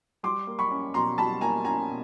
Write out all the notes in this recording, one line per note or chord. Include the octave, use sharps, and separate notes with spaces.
G3 C6 D6
A#3
B5 C#6
C#4
B2 A#5 C6
G3 A5 B5
A#3 G#5 A#5
C#4 G#5 A#5
B2